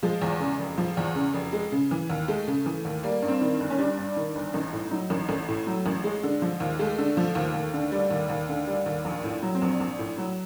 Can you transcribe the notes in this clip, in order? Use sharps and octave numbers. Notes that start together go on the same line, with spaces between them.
F3 G#3
E2
C#3
F1
F3
E2
C#3
F1
G#3
C#3
E3
D#2
G#3 A3
C#3
E3
D#2
G3 A#3
G2
C4
D#3
G1
C#4
G3 D4
G2
D#3
G1
A1 D#4
A2
F#3 D#4
A1
A1 A3
A2
F#3
A1
G#3
D3
F3
D#2
G#3 A3
D3
F3
D#2
D#2
D3
G3
D#2
D#2
D3
G3
D#2
A#1
A2
F#3
C4
A#1
A#1
A2
F#3